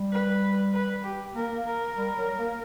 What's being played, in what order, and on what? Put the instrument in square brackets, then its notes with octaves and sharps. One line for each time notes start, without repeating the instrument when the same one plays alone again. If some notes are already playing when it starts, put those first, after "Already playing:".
Already playing: [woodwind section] G3
[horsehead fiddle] B4
B4
G4
[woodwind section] A#3 [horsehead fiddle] A#4
[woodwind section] A#3
[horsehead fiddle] A#4
[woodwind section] G3
F#3
A#3